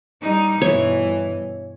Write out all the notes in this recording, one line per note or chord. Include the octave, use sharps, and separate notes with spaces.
G3 D#4
G2 B2 E3 C#5